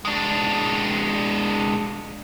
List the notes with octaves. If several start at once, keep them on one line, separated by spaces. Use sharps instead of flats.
G#3 D4